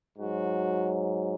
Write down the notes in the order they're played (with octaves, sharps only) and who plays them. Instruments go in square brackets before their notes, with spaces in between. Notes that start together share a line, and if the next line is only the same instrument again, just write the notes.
[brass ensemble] G#2 F#3 F#4